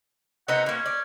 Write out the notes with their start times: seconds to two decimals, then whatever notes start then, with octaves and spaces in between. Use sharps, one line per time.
0.48 C3 B3 D#4 F#5
0.66 B2 A#3 C#4
0.86 D5